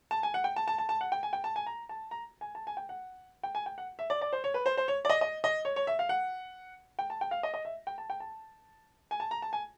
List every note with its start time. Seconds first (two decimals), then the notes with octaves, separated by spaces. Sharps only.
0.11 A5
0.23 G#5
0.34 F#5
0.44 G5
0.56 A5
0.68 A5
0.78 A5
0.89 A5
1.01 F#5
1.12 G5
1.23 G#5
1.33 G5
1.44 A5
1.56 G#5
1.66 A#5
1.89 A5
2.11 A#5
2.41 G#5
2.55 A5
2.67 G#5
2.77 G5
2.89 F#5
3.43 G5
3.55 G#5
3.66 G5
3.78 F#5
3.99 E5
4.10 D5
4.21 D5
4.33 C5
4.44 C#5
4.54 B4
4.66 C5
4.77 C5
4.88 C#5
5.05 D5
5.10 D#5
5.21 D#5
5.44 D#5
5.65 C#5
5.76 C#5
5.87 E5
5.99 F5
6.09 F#5
6.99 G5
7.10 A5
7.21 G5
7.31 F5
7.43 D#5
7.54 D#5
7.65 E5
7.87 G5
7.98 A5
8.10 G5
8.20 A5
9.11 G#5
9.20 A5
9.31 A#5
9.42 A5
9.53 G#5